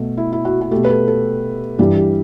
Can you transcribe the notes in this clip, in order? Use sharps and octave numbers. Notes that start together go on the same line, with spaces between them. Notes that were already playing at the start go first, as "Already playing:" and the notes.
Already playing: B2 A3
E4
E4
F#4
F#4
B2 A3 G4
B4
A4
A4
G2 E3 G3 G4
G4